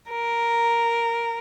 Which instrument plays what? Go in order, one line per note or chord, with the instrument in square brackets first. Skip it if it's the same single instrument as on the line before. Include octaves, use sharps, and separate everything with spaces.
[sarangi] A#4